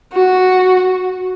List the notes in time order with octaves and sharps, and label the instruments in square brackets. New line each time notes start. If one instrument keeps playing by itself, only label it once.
[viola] F#4